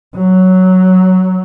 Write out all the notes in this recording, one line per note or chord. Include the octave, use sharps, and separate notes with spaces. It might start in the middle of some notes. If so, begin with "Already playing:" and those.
F#3